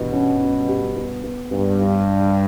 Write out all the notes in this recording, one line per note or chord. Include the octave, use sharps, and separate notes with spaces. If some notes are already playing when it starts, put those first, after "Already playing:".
Already playing: G2 B2 E3
C#4
C#4
G4
B3
B3
G2 B3
D4